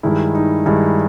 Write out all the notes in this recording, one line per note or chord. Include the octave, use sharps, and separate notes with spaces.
G2 D#3 G#3 E4
D#4
G2 D#3 G#3 E4